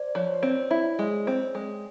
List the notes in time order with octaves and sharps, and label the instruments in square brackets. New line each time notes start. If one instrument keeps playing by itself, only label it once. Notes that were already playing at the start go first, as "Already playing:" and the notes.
Already playing: [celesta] C5 D5
[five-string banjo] F3 [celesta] C#5
[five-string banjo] C4
E4
G#3
C4
G#3